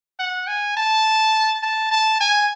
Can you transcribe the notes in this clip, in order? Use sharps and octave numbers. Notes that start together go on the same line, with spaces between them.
F#5
G#5
A5
A5
A5
G#5